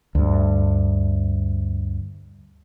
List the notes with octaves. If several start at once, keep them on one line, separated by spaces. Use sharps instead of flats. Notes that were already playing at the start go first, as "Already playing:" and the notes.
D2 G2